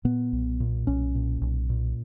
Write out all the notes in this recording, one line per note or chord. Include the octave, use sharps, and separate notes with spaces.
A#2 B3
B1
A#2
B1 C#4
A#2
B1
A#2